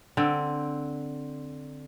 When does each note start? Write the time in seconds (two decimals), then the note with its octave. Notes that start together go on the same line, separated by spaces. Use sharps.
0.17 D3 C4